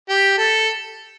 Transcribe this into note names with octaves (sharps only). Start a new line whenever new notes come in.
G4
A4